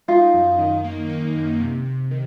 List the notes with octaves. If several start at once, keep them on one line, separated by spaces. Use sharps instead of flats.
D#4 F4
F#2
D#3
A#3
D#4
F#2
C3
C3
D#3